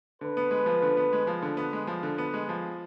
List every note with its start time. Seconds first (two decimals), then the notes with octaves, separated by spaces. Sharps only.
0.21 D3 B4
0.37 B3
0.51 G#3
0.66 F3
0.82 D3
0.97 B3
1.13 G#3
1.27 F3
1.42 D3
1.57 B3
1.73 G#3
1.87 F3
2.03 D3
2.18 B3
2.34 G#3
2.49 F3